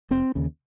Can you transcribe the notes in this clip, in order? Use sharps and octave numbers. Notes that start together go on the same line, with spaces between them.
F1 C4
D#2 C#3